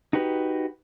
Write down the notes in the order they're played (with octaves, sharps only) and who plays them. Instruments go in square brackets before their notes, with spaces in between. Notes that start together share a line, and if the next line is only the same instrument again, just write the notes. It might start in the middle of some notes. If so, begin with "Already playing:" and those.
[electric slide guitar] D#4 F#4 G4 B4